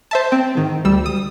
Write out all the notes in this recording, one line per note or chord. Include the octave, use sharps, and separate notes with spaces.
C5 E5 A5
C4
G#2 D#3
D2 G3 E6
D#6